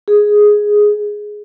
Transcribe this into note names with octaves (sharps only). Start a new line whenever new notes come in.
G#4